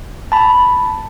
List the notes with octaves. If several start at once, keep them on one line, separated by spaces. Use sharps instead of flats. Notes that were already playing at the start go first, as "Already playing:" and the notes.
A5 B5